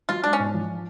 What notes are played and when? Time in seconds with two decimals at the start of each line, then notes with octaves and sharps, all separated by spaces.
0.09 F#3 F4
0.23 G#3 D4
0.33 C#4
0.39 G#2
0.54 F3